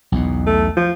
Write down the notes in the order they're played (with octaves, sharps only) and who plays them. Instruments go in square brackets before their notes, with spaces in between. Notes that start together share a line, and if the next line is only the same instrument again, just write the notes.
[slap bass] B1 E2 B2
[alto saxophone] A3
F3